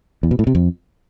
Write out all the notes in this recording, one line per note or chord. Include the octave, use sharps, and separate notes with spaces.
E2
B2
A2
C3
F2